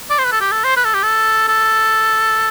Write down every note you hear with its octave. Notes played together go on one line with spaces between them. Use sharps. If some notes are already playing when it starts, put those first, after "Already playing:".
D5
C5
B4
A4
G4
A4
C5
B4
A4
G4
A4
A4